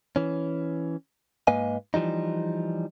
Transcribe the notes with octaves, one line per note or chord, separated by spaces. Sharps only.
E3 C#4
G#2 A#3 B4 D#5 F5 G#5
E3 F3 G3 D#4